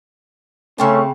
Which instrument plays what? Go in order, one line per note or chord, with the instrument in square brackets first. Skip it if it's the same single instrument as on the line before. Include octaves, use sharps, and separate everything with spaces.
[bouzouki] C#3 C4 A5 [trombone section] A3 C#4